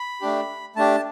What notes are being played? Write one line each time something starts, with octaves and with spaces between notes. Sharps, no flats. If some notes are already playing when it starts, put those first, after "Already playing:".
Already playing: B5
A3 D4 G4
A3 D4 G4 A5